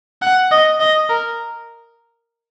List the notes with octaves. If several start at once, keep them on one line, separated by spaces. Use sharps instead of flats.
F#5
D#5
D#5
A#4